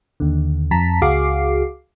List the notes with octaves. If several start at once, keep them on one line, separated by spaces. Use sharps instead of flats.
D#2 D3
F2 A5 A#5 B6
C#2 F#4 G#4 F5 D6 C7